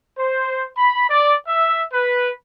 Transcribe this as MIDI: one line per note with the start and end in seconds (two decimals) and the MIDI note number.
0.18 0.66 72
0.77 1.05 83
1.10 1.36 74
1.47 1.82 76
1.93 2.30 71